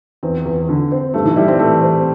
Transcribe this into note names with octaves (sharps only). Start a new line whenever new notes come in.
E2 C4
E2
D3
C4
G2 A3
E3
G3 E4
C4
E3 A3
C4